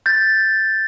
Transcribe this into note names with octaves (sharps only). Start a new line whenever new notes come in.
G6 A6